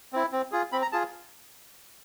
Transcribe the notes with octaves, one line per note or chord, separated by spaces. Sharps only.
C4 E4
C4
F4 G#4
C4 B5
A#5
F4 G#4 A5